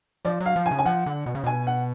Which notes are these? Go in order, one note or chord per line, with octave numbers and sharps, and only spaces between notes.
F3 D5
F#3
F5
F3
G#5
C#3
G#5
F3 F#5
D3
B2
C#3
B2 G#5
F#5